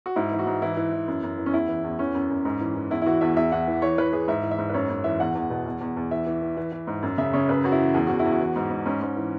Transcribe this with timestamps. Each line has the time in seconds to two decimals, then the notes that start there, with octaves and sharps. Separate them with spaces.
0.06 F#4
0.16 G#2 E4
0.31 E3 E4
0.39 F#4
0.47 G#2
0.62 E3 E4
0.77 E3
0.93 E3
1.08 F#2
1.23 F#2
1.38 E3
1.46 C#4
1.53 E2 E4
1.68 E3
1.84 E2
1.99 E3 C#4
2.15 F#2
2.30 F#2
2.45 G#2
2.60 E3
2.76 E3
2.91 E2 E4
3.02 E4
3.06 E3 F#4
3.21 E2 E5
3.36 E2 E5
3.52 E2 F#5
3.67 E3
3.82 E3 C#5
3.98 E3 B4
4.13 E3 G#4
4.28 G#2 E5
4.43 E3
4.51 E5
4.59 G#2
4.69 B4
4.74 F#2 C#5
4.89 F#2
5.04 E3 E5
5.20 E2 F#5
5.35 E2
5.50 B2
5.65 E2
5.81 E2
5.97 E2
6.11 E3 E5
6.26 E3
6.42 E3
6.57 E3
6.72 E3
6.87 G#2
7.03 F#2
7.18 C#3 E5
7.33 C#3 C#5
7.49 F#2 B4
7.64 F#2 F#4
7.72 E4
7.79 E3
7.94 E2 G#4
8.07 E2 F#4
8.19 E4
8.25 E2
8.32 F#4
8.40 E3
8.56 G#2
8.71 G#2
8.86 G#2 C#4
9.01 G#2
9.17 E3